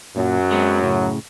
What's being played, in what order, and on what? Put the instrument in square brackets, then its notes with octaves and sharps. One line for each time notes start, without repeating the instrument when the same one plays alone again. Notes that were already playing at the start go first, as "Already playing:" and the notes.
[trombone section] F#2 F#3 [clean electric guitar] A#2
[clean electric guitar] G#3 B3 C4
A2 C#3